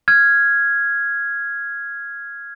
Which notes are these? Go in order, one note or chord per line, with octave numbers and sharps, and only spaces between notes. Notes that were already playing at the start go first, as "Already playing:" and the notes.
F6 G#6